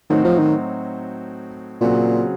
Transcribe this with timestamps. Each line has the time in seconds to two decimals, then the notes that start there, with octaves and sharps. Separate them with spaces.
0.10 A2 D#3 F#3 C4 D#4 F#4
0.25 F3
0.39 D#3
1.81 A#2 C#3 F#3 C4 F#4